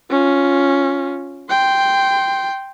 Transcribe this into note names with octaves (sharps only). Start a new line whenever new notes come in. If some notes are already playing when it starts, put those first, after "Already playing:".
C#4 F4
G5 C6